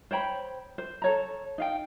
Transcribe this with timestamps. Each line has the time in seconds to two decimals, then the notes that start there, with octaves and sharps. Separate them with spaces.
0.11 C5 C#5 G5 B5
0.78 C5
1.02 A4 C#5 A#5
1.58 D#4 F5 G5